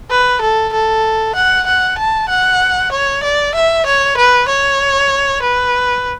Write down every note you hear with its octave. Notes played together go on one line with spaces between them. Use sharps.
B4
A4
A4
F#5
F#5
A5
F#5
C#5
D5
E5
C#5
B4
C#5
B4